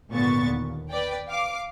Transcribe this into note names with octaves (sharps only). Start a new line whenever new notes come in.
G#1 A#2 D3 B3 C#6 A6
D#2
B4 D5 G5
F5 D6